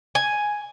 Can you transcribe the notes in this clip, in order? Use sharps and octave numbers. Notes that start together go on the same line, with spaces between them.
G#5